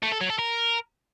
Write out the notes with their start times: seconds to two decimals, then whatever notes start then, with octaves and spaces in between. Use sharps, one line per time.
0.03 A3
0.12 A4
0.21 F#3
0.30 A4
0.39 A#4